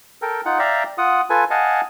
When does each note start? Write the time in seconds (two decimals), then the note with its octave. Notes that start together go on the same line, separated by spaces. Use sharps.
0.22 A4 A#4 G5
0.45 D#4 F4 F#5
0.59 D5 E5 F5 G5 A#5
0.98 F4 F#5 D#6
1.30 F4 A4 B4 G#5
1.50 D#5 F5 F#5 G#5 A5